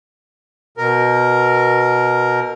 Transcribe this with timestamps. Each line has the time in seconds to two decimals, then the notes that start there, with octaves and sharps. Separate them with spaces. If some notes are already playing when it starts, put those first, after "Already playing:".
0.77 B2 A#4